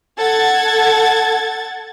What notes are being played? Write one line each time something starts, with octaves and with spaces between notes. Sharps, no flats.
A4 F#5 G#6 A6